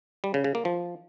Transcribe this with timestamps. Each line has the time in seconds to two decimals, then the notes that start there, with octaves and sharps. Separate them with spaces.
0.24 G3
0.34 C#3
0.44 C#3
0.55 A#3
0.65 F3